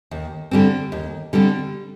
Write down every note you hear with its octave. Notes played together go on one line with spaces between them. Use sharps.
D#2
D3 G3 C4
D#2
D3 G3 C4